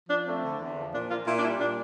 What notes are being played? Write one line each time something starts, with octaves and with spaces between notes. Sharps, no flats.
F3 D4
A3 C4
D3
E2
F3
A#2 D4
A#3 F4
A#2 E4
D4
G3 E4
A#2 D4